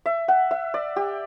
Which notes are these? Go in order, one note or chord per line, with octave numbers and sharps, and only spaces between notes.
E5
F#5
E5
D5
G4